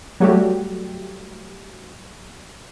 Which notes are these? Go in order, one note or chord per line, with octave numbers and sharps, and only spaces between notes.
F#3 G3 A3 F#4 G4